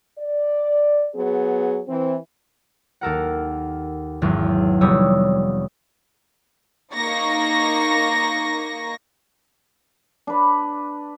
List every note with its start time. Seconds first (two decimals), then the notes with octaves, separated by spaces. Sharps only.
0.19 D5
1.15 F#3 B3 G#4
1.88 E3 C4
3.01 D#2 A4 A#4 F#5
4.22 G#1 E2 F#3
4.81 F1 G3 B3 C#5 D#6 E6
6.95 A#3 D#4 C#6 A#6
10.27 D4 B4